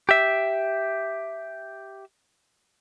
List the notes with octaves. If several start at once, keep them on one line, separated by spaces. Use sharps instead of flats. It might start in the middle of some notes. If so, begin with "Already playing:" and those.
G4 E5